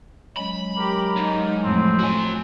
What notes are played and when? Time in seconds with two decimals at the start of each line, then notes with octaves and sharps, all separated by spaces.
0.37 F#3 G#3 C#4 B5
0.77 G4 A#4
1.17 G#2 D#4
1.64 F2 A2 C4
2.00 F#4 G#5